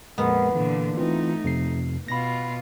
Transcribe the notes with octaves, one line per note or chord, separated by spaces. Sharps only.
F2 A#2 G#3 B3 A#4 F#5
A#2 D3 E3
E3 A3 C4 D#4 F4
F2 C3 C7
B2 F4 B5 A#6